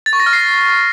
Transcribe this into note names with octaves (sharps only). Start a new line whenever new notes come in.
A6
C#6
A#6
F6
C7